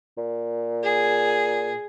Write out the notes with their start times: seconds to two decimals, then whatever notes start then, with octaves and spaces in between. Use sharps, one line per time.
0.18 A#2
0.83 G#4